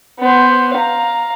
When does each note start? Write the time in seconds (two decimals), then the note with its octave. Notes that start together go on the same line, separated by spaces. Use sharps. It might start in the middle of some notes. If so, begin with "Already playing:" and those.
0.19 B3 C5
0.74 F5 A#5